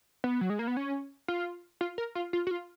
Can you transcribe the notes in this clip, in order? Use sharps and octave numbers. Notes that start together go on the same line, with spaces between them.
B3
F#3
G#3
A#3
B3
C#4
F4
F4
A#4
F4
F4
F#4
F4